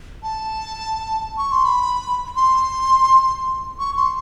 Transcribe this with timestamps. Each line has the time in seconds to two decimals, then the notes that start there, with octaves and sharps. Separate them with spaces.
0.23 A5
1.38 C#6
1.52 C6
1.65 B5
2.36 C6
3.79 C#6
3.97 C6